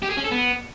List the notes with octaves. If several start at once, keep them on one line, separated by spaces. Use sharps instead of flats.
G4
G#4
C#4
A4
B3